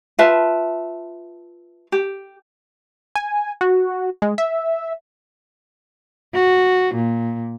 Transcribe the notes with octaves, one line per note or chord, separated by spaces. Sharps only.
F4 B4 E5 A5
G4
G#5
F#4
G#3
E5
F#4
A#2